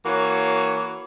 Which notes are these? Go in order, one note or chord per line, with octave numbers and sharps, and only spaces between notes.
E3 A#3 F#4 C#5